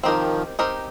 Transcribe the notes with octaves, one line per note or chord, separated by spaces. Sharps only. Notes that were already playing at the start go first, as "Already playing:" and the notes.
D#3 F3 C4 D#4 G4 A#4
C4 D#4 G4 A#4